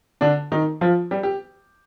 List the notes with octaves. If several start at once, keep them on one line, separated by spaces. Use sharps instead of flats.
D3 D4
D#3 D#4
F3 F4
G3 G4
G4